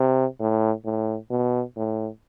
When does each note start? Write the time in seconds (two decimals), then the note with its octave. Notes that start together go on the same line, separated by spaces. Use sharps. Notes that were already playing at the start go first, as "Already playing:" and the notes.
Already playing: C3
0.40 A2
0.85 A2
1.30 B2
1.76 A2